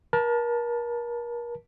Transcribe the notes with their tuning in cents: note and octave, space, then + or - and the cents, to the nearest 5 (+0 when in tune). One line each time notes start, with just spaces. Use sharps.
A#4 +35 A5 +0